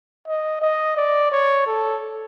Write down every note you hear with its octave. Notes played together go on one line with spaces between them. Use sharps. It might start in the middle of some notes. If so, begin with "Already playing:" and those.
D#5
D#5
D5
C#5
A4